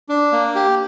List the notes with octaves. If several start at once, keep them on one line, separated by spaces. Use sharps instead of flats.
D4
A#3
G4